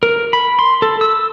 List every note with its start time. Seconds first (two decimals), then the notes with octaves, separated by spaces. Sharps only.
0.03 A#4
0.33 B5
0.59 C6
0.82 A4
1.01 E6